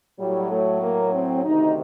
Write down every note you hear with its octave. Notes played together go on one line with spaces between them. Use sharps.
A2 F#3 G3
A3
A#3
C4
D2 C3 D#3 D#4